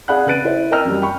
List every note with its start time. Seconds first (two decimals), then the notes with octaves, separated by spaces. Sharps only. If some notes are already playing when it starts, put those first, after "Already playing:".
0.08 G#4 D5 F5 F#5 B5 F#6
0.26 C#3 B4 F#6 A6 D7 D#7
0.44 E4 C5
0.71 A#4 D#5 G5 A#5 E6 F6
0.85 F#2 G3
1.02 G5 B5 C#6